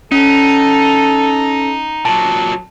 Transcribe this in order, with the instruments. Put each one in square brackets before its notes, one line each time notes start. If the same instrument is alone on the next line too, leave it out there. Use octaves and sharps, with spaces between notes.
[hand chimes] C#4 [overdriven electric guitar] D#4 [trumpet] A4
[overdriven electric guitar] A#2 F#3 [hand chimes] A5